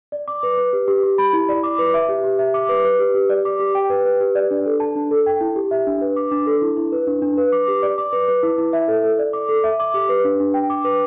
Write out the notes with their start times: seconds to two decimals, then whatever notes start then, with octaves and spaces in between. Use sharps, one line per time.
0.12 D5
0.28 D6
0.43 B4
0.58 B4
0.73 G4
0.88 G4
1.03 G4
1.18 B5
1.33 E4
1.49 D5
1.63 D6
1.79 B4
1.94 E5
2.09 G4
2.24 G4
2.39 E5
2.54 D6
2.69 B4
2.85 B4
2.99 G4
3.14 G4
3.30 D5
3.45 D6
3.60 G4
3.75 G5
3.90 B4
4.05 B4
4.21 G4
4.35 D5
4.51 D4
4.66 A4
4.80 A5
4.95 D4
5.11 A4
5.26 G5
5.41 E4
5.56 G4
5.71 E5
5.87 D4
6.01 B4
6.16 D6
6.31 D4
6.47 A4
6.62 E4
6.77 E4
6.92 B4
7.07 D4
7.22 D4
7.38 B4
7.52 D6
7.68 G4
7.83 D5
7.98 D6
8.13 B4
8.28 B4
8.43 E4
8.58 E4
8.73 E5
8.88 A4
9.03 A4
9.19 D5
9.33 D6
9.49 A4
9.64 E5
9.80 D6
9.94 G4
10.09 B4
10.24 D4
10.40 D4
10.54 G5
10.70 D6
10.84 B4